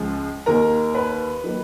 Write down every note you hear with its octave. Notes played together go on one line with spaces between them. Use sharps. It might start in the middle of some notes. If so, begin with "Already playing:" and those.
Already playing: C#2 C#3 F3 G#3
D#2 D#3 A#3 A#4 A#5
B4 B5
D#3 F#3 A#3